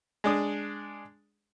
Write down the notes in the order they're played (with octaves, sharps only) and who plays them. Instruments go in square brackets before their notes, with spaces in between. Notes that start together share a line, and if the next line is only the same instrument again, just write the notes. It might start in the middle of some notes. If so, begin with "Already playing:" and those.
[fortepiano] G#3 D4 D#6